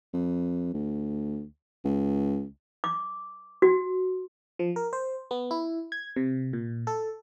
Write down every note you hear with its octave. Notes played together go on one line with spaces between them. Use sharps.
F2
D2
C#2
D6
F#4
F3
A#4
C5
B3
E4
G#6
C3
A#2
A4